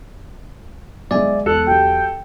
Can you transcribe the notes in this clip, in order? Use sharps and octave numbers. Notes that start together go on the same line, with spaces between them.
B1 G#3 D5 E5 G#5
E2 A4 F#6
F#3 G4 G5